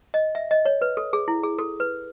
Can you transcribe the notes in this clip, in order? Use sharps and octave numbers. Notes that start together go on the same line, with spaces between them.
D#5
E5
D#5
C#5
B4
A4
G#4
E4
G#4
A4
B4